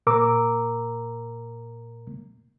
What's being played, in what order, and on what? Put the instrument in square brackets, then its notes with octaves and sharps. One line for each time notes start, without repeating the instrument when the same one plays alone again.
[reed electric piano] A#2 A#4 A#5 D6 E6